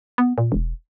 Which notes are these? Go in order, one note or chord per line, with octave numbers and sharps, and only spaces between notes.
B3
A#2
E1